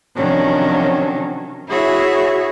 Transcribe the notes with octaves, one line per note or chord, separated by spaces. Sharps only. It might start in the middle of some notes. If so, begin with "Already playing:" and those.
C3 D#3 F3 F#3 C#4 D4
E4 F#4 G#4 C#5 E5